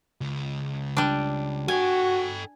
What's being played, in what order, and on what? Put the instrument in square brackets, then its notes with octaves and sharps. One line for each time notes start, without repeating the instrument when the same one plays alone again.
[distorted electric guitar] C#2
[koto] G3 D4
[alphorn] F#4 [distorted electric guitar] A4 G5 [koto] G#5